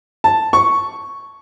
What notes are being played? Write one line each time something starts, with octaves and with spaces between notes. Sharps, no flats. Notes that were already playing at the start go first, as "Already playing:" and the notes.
A5
C#6